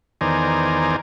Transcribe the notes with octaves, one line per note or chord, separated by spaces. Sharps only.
E2 D#3 C5 D5 G#5 A#5